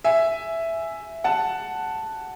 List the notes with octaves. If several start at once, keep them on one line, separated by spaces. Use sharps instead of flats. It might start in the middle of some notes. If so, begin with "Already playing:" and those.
E5 G#5
F#5 A5